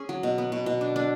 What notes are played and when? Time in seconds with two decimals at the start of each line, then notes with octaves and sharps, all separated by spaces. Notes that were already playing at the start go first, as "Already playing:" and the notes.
Already playing: C#4 G#4
0.09 F#3
0.23 B2
0.38 B3
0.52 B2
0.66 B2
0.81 D4
0.96 D4